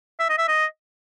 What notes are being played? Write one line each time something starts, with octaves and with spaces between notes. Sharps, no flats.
E5
D#5
E5
D#5